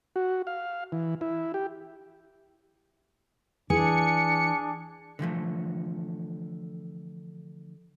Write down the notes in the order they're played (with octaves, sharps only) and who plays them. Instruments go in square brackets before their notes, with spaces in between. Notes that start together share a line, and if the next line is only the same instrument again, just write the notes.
[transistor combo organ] F#4
F5
E3
E4
G4
[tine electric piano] E3 [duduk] D4 [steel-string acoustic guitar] G#4 [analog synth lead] C#7
[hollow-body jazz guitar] D3 E3 F3 A3